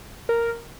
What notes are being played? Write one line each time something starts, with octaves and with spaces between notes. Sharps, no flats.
A#4